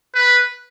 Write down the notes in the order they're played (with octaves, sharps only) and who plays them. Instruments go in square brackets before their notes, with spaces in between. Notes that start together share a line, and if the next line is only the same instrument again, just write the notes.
[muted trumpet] B4